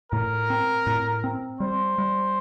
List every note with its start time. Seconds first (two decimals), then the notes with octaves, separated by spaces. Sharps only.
0.12 A2 A#4
0.50 C4
0.87 A2
1.24 C4
1.60 G3 C5
1.98 G3